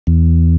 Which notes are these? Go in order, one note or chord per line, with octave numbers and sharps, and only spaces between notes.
E2